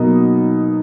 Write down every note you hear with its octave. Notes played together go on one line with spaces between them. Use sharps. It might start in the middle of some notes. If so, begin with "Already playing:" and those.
Already playing: B2 F#3 A#3 D#4